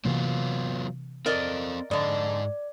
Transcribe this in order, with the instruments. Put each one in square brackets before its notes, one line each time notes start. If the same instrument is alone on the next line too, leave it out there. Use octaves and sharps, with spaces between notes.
[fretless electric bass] C3 E3 A#3 [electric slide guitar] F#3 B3 F4
[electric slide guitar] C4 A4 [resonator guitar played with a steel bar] A#4 D5 D#5
[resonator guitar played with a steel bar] F2 D3 [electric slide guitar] G#2 D#5 [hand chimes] D5